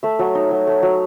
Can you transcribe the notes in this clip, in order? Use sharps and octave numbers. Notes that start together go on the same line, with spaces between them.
A3 E5
F#3
D#4
F#3
A3
F#3